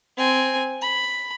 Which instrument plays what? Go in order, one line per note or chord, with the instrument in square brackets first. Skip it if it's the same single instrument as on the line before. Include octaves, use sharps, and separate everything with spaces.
[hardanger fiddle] C4 G#5
B5